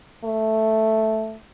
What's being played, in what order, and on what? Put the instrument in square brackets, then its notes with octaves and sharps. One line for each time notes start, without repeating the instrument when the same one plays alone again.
[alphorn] A3